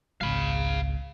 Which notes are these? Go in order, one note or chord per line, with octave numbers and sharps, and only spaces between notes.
G#1 C#2 F5 B5